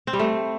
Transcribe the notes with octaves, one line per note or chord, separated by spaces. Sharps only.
C4
G3
A3